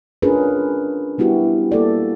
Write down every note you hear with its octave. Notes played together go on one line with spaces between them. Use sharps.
C#4 D4 F4 G#4 A#4 B4
G3 B3 E4 F#4 G4
A#3 A4 D5